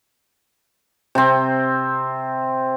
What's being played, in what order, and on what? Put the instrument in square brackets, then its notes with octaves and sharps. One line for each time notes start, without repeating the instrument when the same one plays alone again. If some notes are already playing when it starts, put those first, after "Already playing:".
[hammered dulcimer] C3 C4